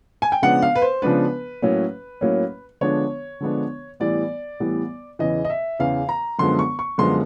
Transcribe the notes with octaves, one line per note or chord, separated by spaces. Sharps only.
G#5
G5
C#3 F3 G#3 B3 D4 F#5
F5
B4
C5
C#3 F3 G#3 B3 D4 B4
A2 F#3 A#3 C#4
A2 F#3 A#3 C#4
D3 F3 G#3 B3 D4 C#5
D3 F3 G#3 B3 D4
A2 E3 G3 B3 D5
A2 E3 G3 B3
E2 C#3 E3 D#5
D#5
E5
E2 C#3 E3 F5
A#5
F#2 D3 F3 G#3 B3 C6
C#6
C#6
F#2 D3 F3 G#3 B3 C6